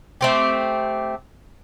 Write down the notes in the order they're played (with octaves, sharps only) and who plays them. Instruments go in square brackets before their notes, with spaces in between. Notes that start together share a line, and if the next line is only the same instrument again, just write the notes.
[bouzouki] A3 C4 G4